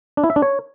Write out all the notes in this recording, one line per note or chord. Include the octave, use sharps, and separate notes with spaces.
D4
E4
E5
D4
C#5